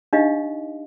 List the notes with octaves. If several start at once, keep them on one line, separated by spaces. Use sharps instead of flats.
D4 D#4 G4 D#5 F5